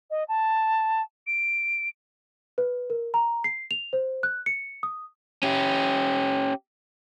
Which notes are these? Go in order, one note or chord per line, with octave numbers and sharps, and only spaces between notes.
D#5
A5
D7
B4
A#4
A#5
C7
F7
C5
F#6
C#7
D#6
C#4 G4